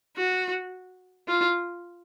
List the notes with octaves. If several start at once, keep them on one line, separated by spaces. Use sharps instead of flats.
F#4
F4